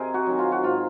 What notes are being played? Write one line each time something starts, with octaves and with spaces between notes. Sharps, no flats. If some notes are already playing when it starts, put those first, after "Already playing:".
Already playing: C3 G#4 A#4 C5 D#5
F#4
D#3 F#3
F4
F#4
G#2 F4